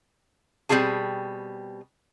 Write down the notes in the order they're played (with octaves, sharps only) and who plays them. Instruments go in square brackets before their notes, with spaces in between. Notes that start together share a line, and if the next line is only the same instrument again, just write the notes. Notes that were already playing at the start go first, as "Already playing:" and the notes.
[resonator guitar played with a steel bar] B2 G3 C4 F4 G#4 A5